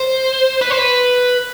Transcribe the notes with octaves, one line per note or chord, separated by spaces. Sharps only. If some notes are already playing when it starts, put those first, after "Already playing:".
Already playing: C5
B4
C5
B4